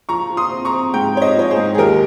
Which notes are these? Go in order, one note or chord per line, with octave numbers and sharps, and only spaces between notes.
F3 A#5 C#6
F3
C6 D#6
C4
A#5 C#6
C4
G#2 G5 A#5
C4 C#5
C5 D#5
F3 C#5
G#4 C5
G#2
G#4
D#2 G4 A#4